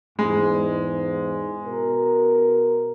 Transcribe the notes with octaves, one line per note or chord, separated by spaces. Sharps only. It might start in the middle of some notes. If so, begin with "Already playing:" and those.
E2 G#2 G#3
B2 A#4